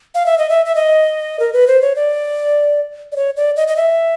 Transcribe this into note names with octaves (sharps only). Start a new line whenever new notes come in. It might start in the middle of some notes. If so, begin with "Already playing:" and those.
F5
E5
D#5
E5
E5
D#5
A#4
B4
C5
C#5
D5
D5
C#5
D5
D#5
D#5
E5